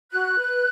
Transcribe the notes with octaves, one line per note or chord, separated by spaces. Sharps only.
F#4 F#6
B4